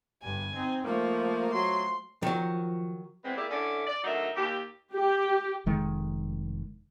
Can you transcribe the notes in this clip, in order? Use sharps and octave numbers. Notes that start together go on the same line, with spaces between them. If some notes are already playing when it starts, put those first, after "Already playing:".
G1 G2 G#5
C4 D#4
F3 A3 A#3
F#3 C6
D#3 F3 F#3
E2 G#3 B3 C4
A#3 E4 G4 G#4 D5
D3 C#4 E4 A4 D5
D5
D2 F#3 D#4 A#4 E5
D#2 G4
G4
F1 D#3 G#3